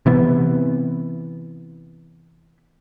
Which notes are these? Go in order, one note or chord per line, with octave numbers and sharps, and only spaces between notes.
C3 E3 B3